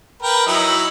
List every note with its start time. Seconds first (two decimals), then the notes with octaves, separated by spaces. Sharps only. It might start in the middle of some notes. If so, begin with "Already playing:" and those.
0.23 A#4 B4 G5
0.47 F#3 D#4 E4